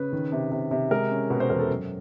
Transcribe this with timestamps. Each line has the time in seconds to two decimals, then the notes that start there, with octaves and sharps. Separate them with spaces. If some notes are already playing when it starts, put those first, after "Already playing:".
Already playing: C#3 B4
0.12 D#3
0.32 C3
0.52 C3
0.71 C3
0.91 G#3 A#4
1.11 C#4
1.30 B2 B4
1.40 C5
1.50 E2 A#4
1.60 A4
1.69 F#2